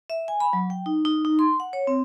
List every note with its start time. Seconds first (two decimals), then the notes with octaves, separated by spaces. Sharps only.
0.10 E5
0.28 G#5
0.40 B5
0.53 F#3
0.70 G5
0.86 D#4
1.05 D#4
1.25 D#4
1.39 C6
1.60 F#5
1.73 C#5
1.87 C4